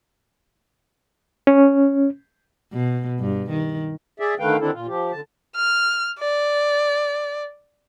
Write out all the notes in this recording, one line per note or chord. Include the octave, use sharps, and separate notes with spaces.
C#4
B2
G2
D#3
G#4 D5 E5
D3 D#3 A3 B4 F5 G5
D3 D#3 C4 D4 E4 A4
A#2 F4
F3 G4
D3 A5
F6
D5